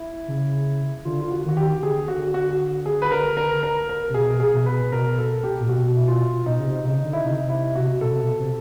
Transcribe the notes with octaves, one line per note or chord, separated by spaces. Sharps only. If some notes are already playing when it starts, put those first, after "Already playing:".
Already playing: E4
C#3
D3 F4
F4
F#4
D#3 F#4
G4
D3 G#4
F#4
F#4
G#4
B4
A#4
A#4
A#4
A#4
C3
B2 G#4
G#4
B2
B4
B2 A#4
A4
G4
A#2
B2 F#4
E4
F4
B2 D#4
C#3
C3
C#3 D#4
D3
E4
C3 D#4
E4
F#4
B2 A4
C3
B2
C3